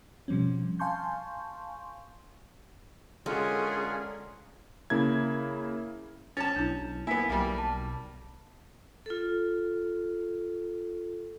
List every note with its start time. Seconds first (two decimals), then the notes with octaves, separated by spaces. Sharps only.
0.28 B2 F3 G3 C4 C#4
0.79 F5 G#5 A5 C6 C#6 G6
3.26 D3 G#3 C#4 F4 G#4 A#4 F#5
4.90 C#3 A#3 E4 G#6
6.37 C#4 A5 A6
6.56 B1 D4 E4
7.07 A#3 B3 E4 G#5 B6
7.30 B1 G3 A#3
7.58 A5
9.06 F4 A4